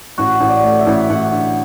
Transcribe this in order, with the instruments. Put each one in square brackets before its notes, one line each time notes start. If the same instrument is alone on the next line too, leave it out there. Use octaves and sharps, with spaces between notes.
[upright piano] A1 [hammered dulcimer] F#4
[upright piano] A1
[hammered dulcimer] D5
[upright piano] A3
[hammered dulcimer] E5
[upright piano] A1
[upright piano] A1 [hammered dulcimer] F#5
[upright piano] D3